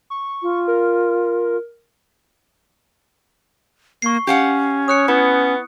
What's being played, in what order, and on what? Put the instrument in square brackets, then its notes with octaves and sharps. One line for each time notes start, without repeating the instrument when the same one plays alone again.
[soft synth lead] C#6
[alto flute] F4
[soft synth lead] A#4
[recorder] A#3 [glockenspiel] C#6 C7
[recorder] C#4 [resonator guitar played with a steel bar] G4 F5 F#5
[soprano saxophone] C#5 [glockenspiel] D#6 F#6 C#7
[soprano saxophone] B3 [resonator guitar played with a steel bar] E4